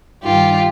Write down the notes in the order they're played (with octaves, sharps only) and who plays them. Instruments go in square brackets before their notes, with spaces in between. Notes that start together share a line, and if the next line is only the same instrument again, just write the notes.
[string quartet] G2 D#3 G3 F4 G4